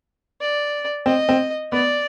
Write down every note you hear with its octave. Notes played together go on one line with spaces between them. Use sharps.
D5
C4 D#5
C4
B3 D5